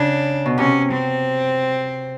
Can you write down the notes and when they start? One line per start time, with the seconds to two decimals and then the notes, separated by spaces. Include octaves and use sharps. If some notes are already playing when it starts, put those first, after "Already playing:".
Already playing: C#3 D4
0.46 B2
0.58 C3 C#4
0.92 C4